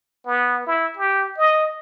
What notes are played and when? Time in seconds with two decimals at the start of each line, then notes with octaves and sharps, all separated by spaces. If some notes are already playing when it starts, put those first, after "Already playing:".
0.26 B3
0.66 E4
0.97 G4
1.38 D#5